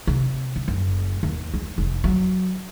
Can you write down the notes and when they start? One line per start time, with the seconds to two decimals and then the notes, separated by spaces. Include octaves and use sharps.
0.07 C3
0.56 D3
0.68 F#1
1.23 D#2
1.54 G#3
1.78 F1
2.04 F#3